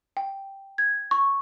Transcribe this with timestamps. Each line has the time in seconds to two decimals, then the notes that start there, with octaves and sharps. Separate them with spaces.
0.17 G5
0.78 G#6
1.11 C#6